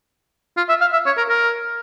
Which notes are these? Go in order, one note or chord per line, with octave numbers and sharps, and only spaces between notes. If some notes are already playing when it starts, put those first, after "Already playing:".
F4
E5
F5
E5
C#5
A#4
A#4